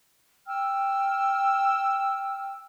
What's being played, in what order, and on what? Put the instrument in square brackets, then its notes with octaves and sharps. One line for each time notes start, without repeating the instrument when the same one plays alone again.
[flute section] G5 E6 F6